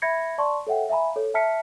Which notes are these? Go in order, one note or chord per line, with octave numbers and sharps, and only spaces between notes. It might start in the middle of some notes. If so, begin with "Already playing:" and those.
E5 B5 G#6 A#6 C#7
D5 A5 C6 C#6
A4 C#5 E5 F#5 G5
E5 F5 G#5 A#5 B5
A4 C#5
E5 A5 A#5 F6 B6 C#7